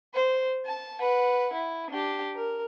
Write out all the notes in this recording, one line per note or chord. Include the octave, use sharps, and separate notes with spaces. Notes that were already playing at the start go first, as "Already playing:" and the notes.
C5
A5
B4 F#5
E4
D4 G4
A#4